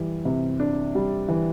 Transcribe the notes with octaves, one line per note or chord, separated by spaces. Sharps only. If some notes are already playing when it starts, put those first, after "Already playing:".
Already playing: E3 G3
C3
D4
G3
E3